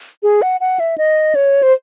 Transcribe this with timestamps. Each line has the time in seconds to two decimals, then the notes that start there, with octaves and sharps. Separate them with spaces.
0.23 G#4
0.42 F#5
0.61 F#5
0.80 E5
0.98 D#5
1.35 C#5
1.63 C5